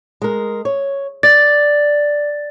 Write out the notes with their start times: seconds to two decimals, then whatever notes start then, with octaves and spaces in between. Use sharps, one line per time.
0.22 G#3 A#4
0.65 C#5
1.23 D5 A6